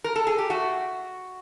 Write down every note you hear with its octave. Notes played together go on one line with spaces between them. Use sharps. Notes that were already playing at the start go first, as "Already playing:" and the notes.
A#4
A4
G#4
G4
A3 F#4